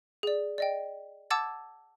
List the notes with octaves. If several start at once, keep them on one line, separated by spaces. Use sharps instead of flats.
G#4 D5
D5 D#5 G5
F#5 A5 D6 E6 G#6 A6